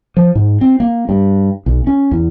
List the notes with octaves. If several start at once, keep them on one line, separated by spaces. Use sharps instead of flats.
F3
G#2
C4
A#3
G2
B1
C#4
E2